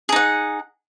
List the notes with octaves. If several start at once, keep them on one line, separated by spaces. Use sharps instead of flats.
D#4 G#4 F#5